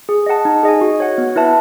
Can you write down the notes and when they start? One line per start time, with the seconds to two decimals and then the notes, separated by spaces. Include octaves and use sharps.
0.09 G#4
0.26 D#5 F#5 A5
0.45 D#4
0.63 G#4 D#5 G#5
0.81 F#4
1.00 C#5 F#5
1.18 B3
1.36 E4 B4 E5 A5